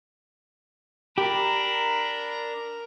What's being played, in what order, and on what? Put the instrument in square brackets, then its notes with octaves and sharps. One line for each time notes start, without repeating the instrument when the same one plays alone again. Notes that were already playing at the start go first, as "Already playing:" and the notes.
[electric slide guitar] D4 [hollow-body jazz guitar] G4 [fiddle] A#4 [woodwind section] A#5 B5